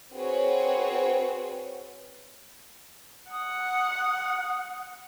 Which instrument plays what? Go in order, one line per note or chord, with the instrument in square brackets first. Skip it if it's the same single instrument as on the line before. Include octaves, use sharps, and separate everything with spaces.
[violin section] C4 F#4 G#4 B4 C#5
[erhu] F#5 [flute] D#6